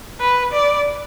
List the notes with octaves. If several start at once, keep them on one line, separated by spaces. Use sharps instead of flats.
B4
D5